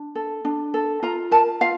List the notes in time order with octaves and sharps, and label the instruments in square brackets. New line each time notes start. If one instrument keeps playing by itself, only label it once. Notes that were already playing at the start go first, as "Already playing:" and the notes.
Already playing: [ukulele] D4
A4
D4
A4
F4 A#5
A#4 A5
F4 F5